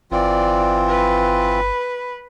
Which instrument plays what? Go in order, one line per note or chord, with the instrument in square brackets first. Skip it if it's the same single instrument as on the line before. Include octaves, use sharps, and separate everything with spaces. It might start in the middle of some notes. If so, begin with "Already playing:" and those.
[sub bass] G1 [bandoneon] E3 C4 F4 [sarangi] D5
[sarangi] B4